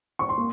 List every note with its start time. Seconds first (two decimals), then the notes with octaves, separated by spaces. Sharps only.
0.19 C#6
0.29 C6
0.37 A#3